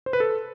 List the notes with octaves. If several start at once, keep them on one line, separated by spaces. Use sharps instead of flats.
C5
B4
A4